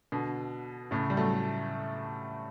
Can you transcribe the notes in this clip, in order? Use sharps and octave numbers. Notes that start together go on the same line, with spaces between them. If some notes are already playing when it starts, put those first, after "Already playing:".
B2 D3
A2 C#3
G3
F#3 A3